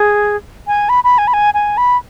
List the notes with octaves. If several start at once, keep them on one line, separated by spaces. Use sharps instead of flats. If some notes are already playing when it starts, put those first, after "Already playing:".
Already playing: G#4
G#5
B5
B5
G#5
B5
G#5
G#5
B5